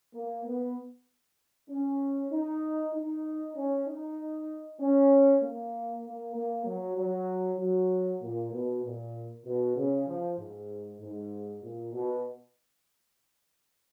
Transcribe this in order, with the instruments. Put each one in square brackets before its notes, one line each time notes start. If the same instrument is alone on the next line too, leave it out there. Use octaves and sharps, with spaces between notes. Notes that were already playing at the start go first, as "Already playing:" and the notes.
[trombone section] A#3
B3
C#4
D#4
D#4
C#4
D#4
C#4
A#3
A#3
A#3
F#3
F#3
F#3
A#2
B2
A#2
B2
C#3
F3
G#2
G#2
A#2
B2